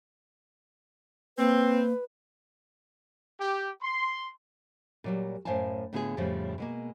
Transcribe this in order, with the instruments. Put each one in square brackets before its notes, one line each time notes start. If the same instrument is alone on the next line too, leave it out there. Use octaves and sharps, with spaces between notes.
[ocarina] A#3 [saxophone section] C4 [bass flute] B4
[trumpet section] G4
C6
[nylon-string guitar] A#2 F#3 G3
F#2 A2 C5 F5 G#5 A5
A2 D3 B3 F4 F#4 G#4
F2 A2 C#3 F3 G3 G#3
B2 G#3 A#3